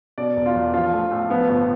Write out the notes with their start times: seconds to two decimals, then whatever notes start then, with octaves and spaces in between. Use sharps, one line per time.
0.18 B2 D5
0.36 E1
0.46 F4
0.55 E2
0.74 F3 F4
0.93 A3
1.11 A2
1.30 F3 B3
1.49 G1